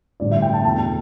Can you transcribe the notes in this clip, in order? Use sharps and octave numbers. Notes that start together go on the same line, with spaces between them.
A1 G2 D3 D5
E5
G5
A5
E2 B2 A3 A5